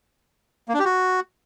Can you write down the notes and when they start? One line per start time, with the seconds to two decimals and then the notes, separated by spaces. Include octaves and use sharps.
0.69 A#3
0.74 D4
0.80 G4
0.85 F#4